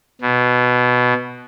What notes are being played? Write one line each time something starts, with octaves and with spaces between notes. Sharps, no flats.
B2